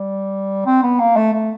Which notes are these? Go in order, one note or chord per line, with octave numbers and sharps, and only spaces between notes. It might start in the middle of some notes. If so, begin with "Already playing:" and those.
Already playing: G3
C4
B3
A#3
A3
A3